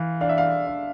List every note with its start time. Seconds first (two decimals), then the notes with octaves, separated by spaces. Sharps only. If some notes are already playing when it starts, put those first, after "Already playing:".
Already playing: E3 F5
0.21 D4 F5
0.29 E5
0.38 F5
0.67 D4